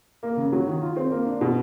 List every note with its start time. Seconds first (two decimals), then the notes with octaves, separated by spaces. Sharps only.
0.23 A#3
0.37 C#3
0.52 F#3
0.67 D#3
0.81 F4
0.96 C4
1.12 A#3
1.26 D4
1.41 B2